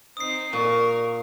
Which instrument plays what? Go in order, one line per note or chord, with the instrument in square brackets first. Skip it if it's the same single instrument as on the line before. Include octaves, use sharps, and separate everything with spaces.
[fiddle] C4 D#4 [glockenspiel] D#6 C7
[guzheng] A#2 [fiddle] A#4 [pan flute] C#6